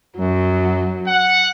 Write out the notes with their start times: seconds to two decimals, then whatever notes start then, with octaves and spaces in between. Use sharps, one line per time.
0.17 F#2 F#3
1.07 F#5